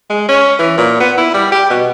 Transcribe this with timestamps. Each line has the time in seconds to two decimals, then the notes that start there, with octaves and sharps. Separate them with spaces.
0.10 G#3
0.29 C#4
0.59 E3
0.77 A#2
1.00 B3
1.17 E4
1.34 G3
1.52 G4
1.70 B2